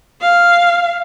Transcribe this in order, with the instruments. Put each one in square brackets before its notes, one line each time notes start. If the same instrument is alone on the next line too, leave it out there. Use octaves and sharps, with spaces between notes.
[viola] F5